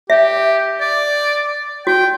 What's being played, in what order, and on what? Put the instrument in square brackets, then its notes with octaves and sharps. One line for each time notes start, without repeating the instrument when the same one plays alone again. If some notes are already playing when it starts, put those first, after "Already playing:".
[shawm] G4 [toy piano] E5
[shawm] D5
[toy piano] F#4 [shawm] G5